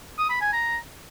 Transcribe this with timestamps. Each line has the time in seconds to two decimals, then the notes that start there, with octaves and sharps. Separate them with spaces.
0.18 D#6
0.30 B5
0.41 G#5
0.53 A#5